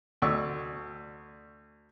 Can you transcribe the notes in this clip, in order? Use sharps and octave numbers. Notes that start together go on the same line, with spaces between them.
D2 D5 C#6 E6